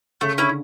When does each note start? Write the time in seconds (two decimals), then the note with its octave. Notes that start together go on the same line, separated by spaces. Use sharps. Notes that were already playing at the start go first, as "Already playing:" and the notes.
0.21 C#3 A3
0.38 D3 C#4 E4